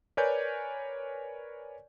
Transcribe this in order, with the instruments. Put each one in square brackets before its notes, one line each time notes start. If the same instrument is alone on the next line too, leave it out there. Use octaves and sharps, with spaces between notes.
[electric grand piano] A#4 B4 C#5 D5 G#5 G6